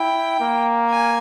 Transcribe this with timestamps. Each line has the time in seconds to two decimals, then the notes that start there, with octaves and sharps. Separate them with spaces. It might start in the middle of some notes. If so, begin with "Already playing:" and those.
Already playing: E4 G5
0.40 A#3
0.90 G#5